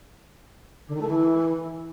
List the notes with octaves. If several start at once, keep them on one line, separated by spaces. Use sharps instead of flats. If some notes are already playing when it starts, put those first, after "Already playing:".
D3
D#3
A3
E3